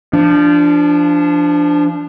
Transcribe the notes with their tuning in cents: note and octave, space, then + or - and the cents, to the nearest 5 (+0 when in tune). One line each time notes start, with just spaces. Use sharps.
F3 -20 D4 +0